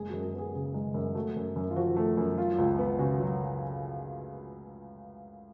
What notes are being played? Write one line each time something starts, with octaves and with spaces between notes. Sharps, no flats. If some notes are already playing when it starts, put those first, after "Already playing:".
Already playing: F#1 G#3 G#4
F#2 F#4
F#4
B3 G#4
C#3 G#4
G#3
F#2
A3 F#4
F#2
F#2
F4
F3 F#4
A3
F#2
F#3 F4
C#2
B3
C#3 F#4
F#3